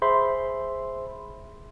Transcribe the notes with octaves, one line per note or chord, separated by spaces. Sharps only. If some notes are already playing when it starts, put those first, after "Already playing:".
G#4 C5 E5 B5 C6